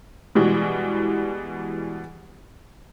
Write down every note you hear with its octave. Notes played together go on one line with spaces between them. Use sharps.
B2 E3 G3 G#3